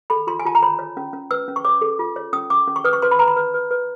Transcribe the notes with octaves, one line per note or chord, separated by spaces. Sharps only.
A4 B5
F4 C6
G#5
F4 A5
A#5
C#5 B5
C#5
C#4
C#4
B4 E6
C#4
C#6
C#5 D6
A4
F4
C#5
C#4 D#6
C#4 D6
C#4
C#6
B4 D#6
C#6
B4 C6
B5
B4 A#5
B5
B4
B4
B4